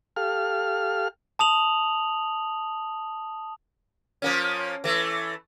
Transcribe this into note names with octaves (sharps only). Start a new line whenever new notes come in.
G4 A4 F5 F6
A5 D#6 F7 F#7
F3 A#3 C#4
E3 A3